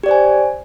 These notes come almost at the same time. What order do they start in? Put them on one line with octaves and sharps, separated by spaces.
G4 D5 C5 G#5